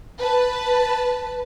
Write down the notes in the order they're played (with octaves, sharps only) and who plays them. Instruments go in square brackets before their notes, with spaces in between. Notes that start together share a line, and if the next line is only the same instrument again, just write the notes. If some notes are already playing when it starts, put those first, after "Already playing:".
[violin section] B4 A5